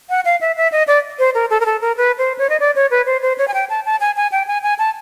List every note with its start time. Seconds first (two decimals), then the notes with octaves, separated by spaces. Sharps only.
0.10 F#5
0.25 F5
0.41 E5
0.57 E5
0.72 D#5
0.87 D5
1.19 C5
1.35 A#4
1.50 A4
1.60 A#4
1.66 A4
1.81 A#4
1.97 B4
2.18 C5
2.39 C#5
2.50 D#5
2.60 D5
2.76 C#5
2.91 B4
3.06 C5
3.22 C5
3.38 C#5
3.48 G#5
3.54 G5
3.70 A5
3.85 A5
4.00 G#5
4.16 G#5
4.32 G5
4.47 G#5
4.63 G#5
4.79 A5